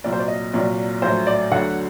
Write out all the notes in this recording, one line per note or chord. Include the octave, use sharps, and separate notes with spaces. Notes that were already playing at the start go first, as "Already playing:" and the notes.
C2 A#2 F#3 D5
C5
D5
D#5
C2 A#2 F#3 D5
A#1 A2 F#3 C5
D5
D2 D3 F#3 F#5